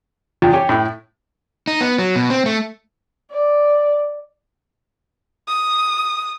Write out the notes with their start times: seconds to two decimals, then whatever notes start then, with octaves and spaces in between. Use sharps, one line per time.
0.42 E2 F4 G5
0.53 G4 C#5 G5 G#5
0.69 A2 E4
1.67 D#4
1.81 B3
1.99 F#3
2.16 B2
2.30 C4
2.46 A3
3.31 D5
5.48 D#6